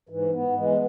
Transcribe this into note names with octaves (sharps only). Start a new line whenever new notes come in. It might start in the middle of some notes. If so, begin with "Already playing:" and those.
G#2 E3
B3
E3 G#3